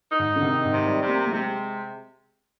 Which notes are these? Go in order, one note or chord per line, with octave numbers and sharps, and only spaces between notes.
D#4
G#2
D3
C3 D#3
G#2
C3
G3
C3
A#3
A#3
C3 G#3